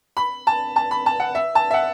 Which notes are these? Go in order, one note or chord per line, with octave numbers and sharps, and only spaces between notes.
B5
A5
A5
B5
A5
F#5
E5
A5
E5
F#5